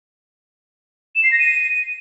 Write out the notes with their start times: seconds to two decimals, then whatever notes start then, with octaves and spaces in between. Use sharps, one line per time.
1.16 E7
1.24 C7
1.32 A#6
1.40 D#7